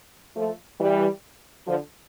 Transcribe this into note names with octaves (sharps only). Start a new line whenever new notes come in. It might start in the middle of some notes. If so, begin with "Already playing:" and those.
F3 A3
E3 G3
D3 F3